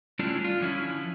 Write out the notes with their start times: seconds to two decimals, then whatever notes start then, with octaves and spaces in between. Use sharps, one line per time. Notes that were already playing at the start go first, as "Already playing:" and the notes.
0.19 G3 A3 C#4 D4 E4 F4
0.44 F4
0.60 D3 F3 C#4 E4